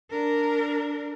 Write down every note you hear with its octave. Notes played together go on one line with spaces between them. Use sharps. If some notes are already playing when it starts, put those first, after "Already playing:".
D4 A#4